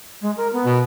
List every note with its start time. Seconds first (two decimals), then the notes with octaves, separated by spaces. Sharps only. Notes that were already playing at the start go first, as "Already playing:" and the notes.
0.21 G#3
0.37 A#4
0.52 B3
0.65 B2